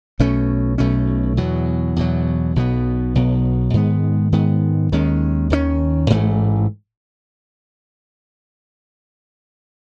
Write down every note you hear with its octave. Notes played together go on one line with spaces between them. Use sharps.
B1 B2 A3 C#4
B1 B2 A3 C#4
E2 B2 F#3
E2 B2 F#3
B1 B2 F#3 B3
B1 B2 F#3 B3
G#2 D#3 G#3 B3
G#2 D#3 G#3 B3
D#2 D#3 G#3 C#4
D#2 D#3 G#3 C#4
A1 G#2 E3 A3